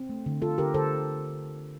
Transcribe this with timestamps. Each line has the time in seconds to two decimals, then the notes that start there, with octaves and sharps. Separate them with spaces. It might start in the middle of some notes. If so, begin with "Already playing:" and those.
Already playing: C4
0.09 A3
0.26 D3
0.41 D3 F4 A4
0.58 D3 G4 A#4
0.74 D3 A4 C5